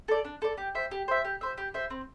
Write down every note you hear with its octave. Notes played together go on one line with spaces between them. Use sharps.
A4 D5
D4
A4 D5
G4
C5 E5
G4
C5 E5
G4
C5 E5
G4
C5 E5
C4